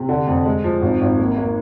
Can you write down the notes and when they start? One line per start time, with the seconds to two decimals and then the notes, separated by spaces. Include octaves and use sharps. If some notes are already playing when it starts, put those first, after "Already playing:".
Already playing: C3
0.09 D3
0.27 F2
0.45 G#3
0.64 F3
0.82 G#1
1.01 G#1
1.19 A#3
1.37 A#3